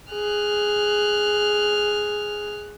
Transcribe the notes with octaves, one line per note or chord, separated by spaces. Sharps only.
G#4 F6 F#6